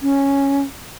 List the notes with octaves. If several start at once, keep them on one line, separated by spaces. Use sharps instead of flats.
C#4